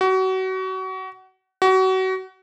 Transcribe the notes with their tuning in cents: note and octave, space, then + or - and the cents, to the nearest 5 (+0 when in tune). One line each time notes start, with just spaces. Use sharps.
F#4 +30
F#4 +30